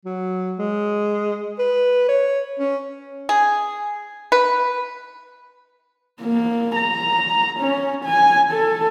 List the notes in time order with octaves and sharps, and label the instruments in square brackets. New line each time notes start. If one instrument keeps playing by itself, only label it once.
[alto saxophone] F#3
G#3
B4
C#5
C#4
[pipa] G#4
B4
[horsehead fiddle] A#3
A#5
C#4
G#5
A4